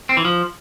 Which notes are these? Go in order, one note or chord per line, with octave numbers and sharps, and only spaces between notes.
C4
E3
F3